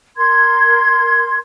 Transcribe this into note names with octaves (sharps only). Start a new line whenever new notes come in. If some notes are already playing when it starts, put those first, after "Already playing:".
A#4 C6 G#6